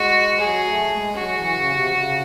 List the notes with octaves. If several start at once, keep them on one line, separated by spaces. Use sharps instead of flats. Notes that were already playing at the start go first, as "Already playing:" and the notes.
Already playing: G#3 F#4
F#3 G#4
A3
G#3
F#3 F#4
E3
C#3
C3
C#3